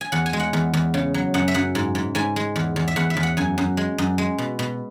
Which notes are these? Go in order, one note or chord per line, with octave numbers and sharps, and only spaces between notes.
G#5
E2 F#5
G#5
G#3
F#5
E2
E2
C#3
F#3
F#2 F#5
E5
F#2 F#5
G#2
G#2
G#2 G#5
G#3
E2
E2
E5
E2 F#5
E5
E2
F#5
F#2 G#5
F#2
G#3
F#2
G#3
B2
B2